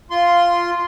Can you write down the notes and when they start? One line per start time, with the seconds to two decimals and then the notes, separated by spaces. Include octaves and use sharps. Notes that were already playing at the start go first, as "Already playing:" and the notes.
0.11 F4 C6